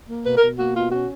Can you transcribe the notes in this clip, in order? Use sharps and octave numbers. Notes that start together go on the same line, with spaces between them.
A#3
B2 B4
A#4
B2
A#3 F#4
B2 F4
C#4 F#4